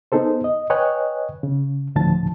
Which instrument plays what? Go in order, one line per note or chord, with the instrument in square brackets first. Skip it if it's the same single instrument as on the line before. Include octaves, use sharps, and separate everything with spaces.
[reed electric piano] B3 D#4 G#4 A4 C5
D#5
B4 C#5 D#5 G5 G#5 F#6
C#3
D2 A2 D3 F3 A5 A6